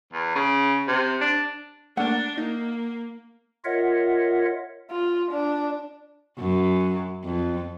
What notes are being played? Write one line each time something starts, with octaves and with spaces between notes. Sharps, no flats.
E2
C#3
C3
D4
A3 A#3 D4 F#5
A#3 D#4
F4 A#4 C#5 D#5 E5 F#5
F4
D4
F#2
F2